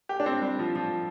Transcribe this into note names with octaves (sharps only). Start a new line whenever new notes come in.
G4
D4
C4
G3
F3
F3